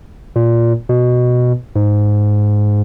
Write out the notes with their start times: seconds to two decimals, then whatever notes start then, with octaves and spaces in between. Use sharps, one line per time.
0.36 A#2
0.89 B2
1.76 G#2